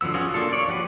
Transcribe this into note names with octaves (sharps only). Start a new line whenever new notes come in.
D3 F3 F#3 B3 E6
C#4 F4 F#4 G#4
A#3 D4 F4 A4
C#5 D5
F3 F#4 G4 B4